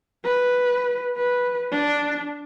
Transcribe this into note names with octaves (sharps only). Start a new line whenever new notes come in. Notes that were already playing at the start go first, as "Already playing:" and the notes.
B4
B4
D4